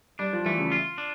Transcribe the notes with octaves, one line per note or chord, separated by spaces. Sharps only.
G3 D4
F3
E3 A3
C#3
F4
D4